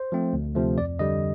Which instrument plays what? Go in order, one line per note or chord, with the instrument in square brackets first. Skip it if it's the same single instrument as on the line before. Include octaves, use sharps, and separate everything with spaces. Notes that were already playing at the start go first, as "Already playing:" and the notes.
Already playing: [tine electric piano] C5
F3 A3 C4
D2
C3 F3 A3
F2 D5
D3 G3 D#5